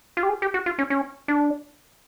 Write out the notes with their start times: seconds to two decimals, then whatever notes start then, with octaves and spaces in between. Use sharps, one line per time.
0.17 F4
0.23 G4
0.29 G#4
0.42 G4
0.54 F#4
0.66 F4
0.79 C#4
0.90 C#4
1.28 D4